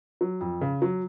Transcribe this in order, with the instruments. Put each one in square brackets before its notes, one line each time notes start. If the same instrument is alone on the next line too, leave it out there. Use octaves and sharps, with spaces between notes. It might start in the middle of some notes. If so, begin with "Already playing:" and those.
[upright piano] F#3
F2
C#3
F#3